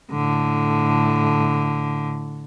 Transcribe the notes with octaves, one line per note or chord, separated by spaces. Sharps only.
A2 D3